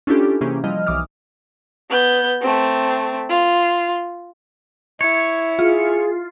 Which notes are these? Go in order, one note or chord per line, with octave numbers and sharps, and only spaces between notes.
C#4 D4 E4 F4 G4 A4
C3 E3 A#3 C#4 G4 G#4
F3 G3 E4 D#5 F6
B1 E3 D6 D#6 F6
B3 G6
A3 C4
F4
E4 C#5 G#6
F4 G#4